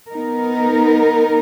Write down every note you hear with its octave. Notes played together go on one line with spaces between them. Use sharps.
B3 D#4 A#4